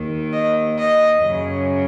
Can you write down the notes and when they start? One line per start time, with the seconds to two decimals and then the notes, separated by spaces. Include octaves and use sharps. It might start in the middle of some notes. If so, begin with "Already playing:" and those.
Already playing: D#2 D#3
0.33 D#5
0.78 D#5
1.22 F#2 C#3